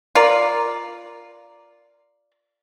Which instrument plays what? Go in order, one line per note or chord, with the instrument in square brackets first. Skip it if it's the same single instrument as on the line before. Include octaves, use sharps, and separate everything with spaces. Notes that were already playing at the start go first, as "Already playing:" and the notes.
[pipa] F4 A#4 D5